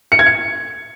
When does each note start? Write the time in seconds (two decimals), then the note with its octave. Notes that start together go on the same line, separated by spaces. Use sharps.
0.12 C#7
0.19 G#6
0.26 C#7